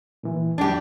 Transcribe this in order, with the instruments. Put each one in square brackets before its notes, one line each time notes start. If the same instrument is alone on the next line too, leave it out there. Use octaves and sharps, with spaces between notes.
[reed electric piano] A#2 E3
[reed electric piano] E2 F3 G3 [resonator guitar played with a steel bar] D4 G4